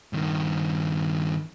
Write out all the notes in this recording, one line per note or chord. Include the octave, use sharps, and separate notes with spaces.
G2 D#3